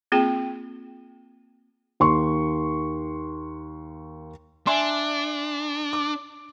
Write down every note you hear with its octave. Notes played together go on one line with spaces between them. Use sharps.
A#3 C4 F4 G#4 G5
D#2 C6 C#6
D4 E5 G#5 C6
D6